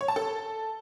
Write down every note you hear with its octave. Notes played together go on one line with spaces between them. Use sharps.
C#5
A5
A4